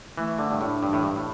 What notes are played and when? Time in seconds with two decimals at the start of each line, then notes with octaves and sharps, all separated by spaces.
0.17 E3 A3
0.39 D3 D4
0.51 G2
0.61 A2 D4
0.83 G2 E3
0.93 A2
1.03 G2 E3
1.16 A2